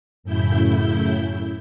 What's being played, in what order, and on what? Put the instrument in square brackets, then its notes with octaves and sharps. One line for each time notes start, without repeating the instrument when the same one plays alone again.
[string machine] F#2 A2 C#3 E4 G6